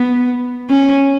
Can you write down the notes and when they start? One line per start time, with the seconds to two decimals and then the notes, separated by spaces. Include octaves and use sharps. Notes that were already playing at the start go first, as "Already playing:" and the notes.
Already playing: B3
0.69 C#4